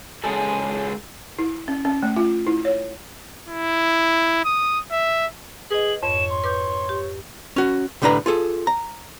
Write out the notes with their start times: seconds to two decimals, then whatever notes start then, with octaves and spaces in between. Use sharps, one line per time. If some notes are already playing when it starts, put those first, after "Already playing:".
0.24 C#3 G#3 G#4 A4
1.39 E4
1.68 C#4
1.85 C#4
2.03 A3
2.16 F4
2.47 E4
2.65 C#5
3.49 E4
4.45 D#6
4.92 E5
5.70 G#4 B4 D#5 F#7
6.03 F2 G#2 C#5 E7
6.30 C6
6.44 B4 D6 G6
6.89 G4
7.56 C#4 F#4
8.02 C2 A2 D3 D4 B4 A#5
8.26 F4 G#4 A4
8.67 A#5